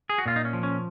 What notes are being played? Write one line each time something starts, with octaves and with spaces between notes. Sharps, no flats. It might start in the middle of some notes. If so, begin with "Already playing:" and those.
G#4
F#4
A#2 F4
D#4
C#4
F3
C#4